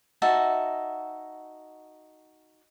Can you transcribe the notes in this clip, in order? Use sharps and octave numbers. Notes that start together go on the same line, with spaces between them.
D#4 F#4 E5 A5